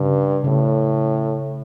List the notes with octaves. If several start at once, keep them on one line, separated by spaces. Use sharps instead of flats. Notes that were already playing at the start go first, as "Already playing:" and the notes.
Already playing: G2 C#3
A2 C#3